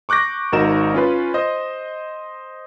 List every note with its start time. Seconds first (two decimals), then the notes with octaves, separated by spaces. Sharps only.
0.09 C#6 D6 F#6 G6 A#6
0.52 G#1 D#4 F#4 A#4 E7
0.94 C#4 F4 B4
1.34 C5 D#5